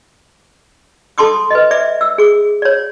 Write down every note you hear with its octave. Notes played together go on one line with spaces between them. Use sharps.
A4 A5 C6 D6 D#6
B4 D#5
D5 E5 D6
E6
G#4 D6
C#5 D5